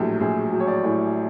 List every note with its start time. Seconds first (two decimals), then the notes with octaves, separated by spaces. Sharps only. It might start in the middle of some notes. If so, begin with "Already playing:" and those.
Already playing: A#1 A2 F#3 G4
0.20 A#1 G#4
0.51 F#3
0.60 C#5
0.67 D5
0.84 A2